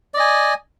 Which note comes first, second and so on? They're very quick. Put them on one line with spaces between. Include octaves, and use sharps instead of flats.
D5 D#5 G#5